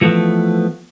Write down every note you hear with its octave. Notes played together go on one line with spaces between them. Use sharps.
E3 F3 A3 B3